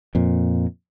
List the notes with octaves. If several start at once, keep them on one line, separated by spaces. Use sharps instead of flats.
F2 A#2